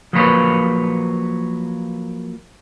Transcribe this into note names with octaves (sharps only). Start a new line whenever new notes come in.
F3 F#3 A#3 B4 C#5